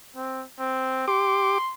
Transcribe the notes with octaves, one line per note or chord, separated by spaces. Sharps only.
C4
C4
G4 C6 D6